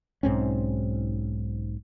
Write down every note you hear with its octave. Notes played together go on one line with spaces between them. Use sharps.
B1 G#2 C4 C#4